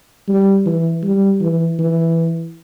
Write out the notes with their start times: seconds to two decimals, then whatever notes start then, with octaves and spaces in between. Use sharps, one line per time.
0.29 G3
0.66 E3
1.04 G3
1.41 E3
1.79 E3